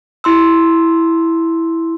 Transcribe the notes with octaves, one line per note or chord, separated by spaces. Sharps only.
E4 C6 E6